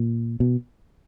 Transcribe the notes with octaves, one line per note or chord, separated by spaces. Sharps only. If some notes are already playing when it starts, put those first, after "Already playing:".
Already playing: A#2
B2